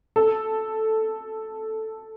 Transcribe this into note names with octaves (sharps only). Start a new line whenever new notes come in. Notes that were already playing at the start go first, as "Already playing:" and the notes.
A4